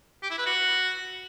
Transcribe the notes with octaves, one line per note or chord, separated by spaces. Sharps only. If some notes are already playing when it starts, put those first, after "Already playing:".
G4
E4
B4
F#4